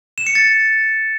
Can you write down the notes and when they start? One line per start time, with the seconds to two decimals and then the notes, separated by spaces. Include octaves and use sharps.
0.18 E7
0.26 C#7
0.35 A6